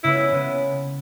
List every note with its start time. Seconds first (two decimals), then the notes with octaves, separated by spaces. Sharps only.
0.04 C#3 G#3 B3 E4
0.18 E4
0.32 C#3 G#3 B3